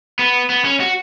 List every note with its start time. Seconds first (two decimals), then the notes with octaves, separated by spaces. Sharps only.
0.19 B3
0.50 B3
0.65 C#4
0.80 F#4